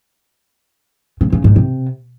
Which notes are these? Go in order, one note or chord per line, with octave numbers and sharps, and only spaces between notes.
C#3
C#3
G#2
C3